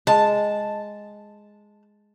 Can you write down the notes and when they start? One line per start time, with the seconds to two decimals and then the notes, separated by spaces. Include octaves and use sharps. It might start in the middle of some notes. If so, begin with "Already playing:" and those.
0.07 G#3 A5